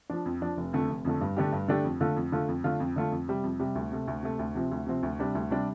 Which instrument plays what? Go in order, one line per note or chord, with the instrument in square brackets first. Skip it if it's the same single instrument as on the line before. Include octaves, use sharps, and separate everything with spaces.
[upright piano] F3 D4
F2
F3 D4
F1
F2 D3 A3
F1
F2 D3 A3
G2
D3 A3 D4 G4
G2
D3 A3 D4 G4
F2
D3 A3 F4
F2
D3 A3 F4
F2
D3 A3 F4
F2
D3 A3 F4
F2
C3 G3
F2
C3 G3
D2
C3 A3
D2
C3 A3
D2
C3 F3 C4
D2
C3 F3 C4
D2
C3 G3 D4
D2
C3 G3 D4